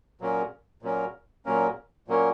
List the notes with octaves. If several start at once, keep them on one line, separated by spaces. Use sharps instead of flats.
A#2 F#3 A#3 C#4 A#4
A#2 F#3 A#3 C#4 A#4
A#2 F#3 A#3 C#4 A#4
A#2 F#3 A#3 C#4 A#4